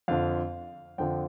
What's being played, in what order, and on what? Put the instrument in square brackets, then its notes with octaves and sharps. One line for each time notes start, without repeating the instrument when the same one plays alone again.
[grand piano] F2 D3 F3 F5
F2 D3 F3 G5